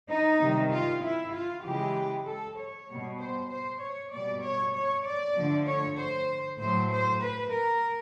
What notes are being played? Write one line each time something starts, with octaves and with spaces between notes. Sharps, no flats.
D#4
C3 D#3 G3
F4
E4
F4
C#3 E3 G#3 G4
A4
C#5
B2 G3
C5
C5
C#5
B2 G3 D5
C#5
C#5
D5
D3 F3 A3
C#5
C5
A2 F#3 A3 C5
C5
B4
A#4